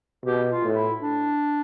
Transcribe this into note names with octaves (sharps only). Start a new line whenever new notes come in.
B2 G4
F4
A2
E4
D4